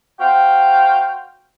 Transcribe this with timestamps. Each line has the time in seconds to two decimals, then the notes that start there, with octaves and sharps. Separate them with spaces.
0.20 F#4 C5 F5 G5